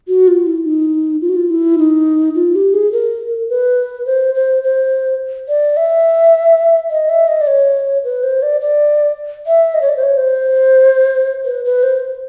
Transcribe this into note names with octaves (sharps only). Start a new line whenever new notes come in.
F#4
F4
E4
D#4
F4
F#4
F4
E4
D#4
F4
G4
G#4
A#4
B4
C5
C5
C5
D5
E5
D#5
E5
D#5
D5
C#5
B4
C5
D5
D5
E5
D#5
C#5
D5
C5
C#5
C5
B4
B4
C5